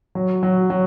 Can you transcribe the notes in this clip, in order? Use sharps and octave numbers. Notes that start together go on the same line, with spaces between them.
F#3
F#3
F#3